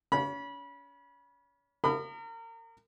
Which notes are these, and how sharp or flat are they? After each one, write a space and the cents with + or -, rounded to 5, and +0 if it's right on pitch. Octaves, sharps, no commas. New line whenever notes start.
C#4 +35 B5 -25
A#4 -30 B5 +25 D#6 -45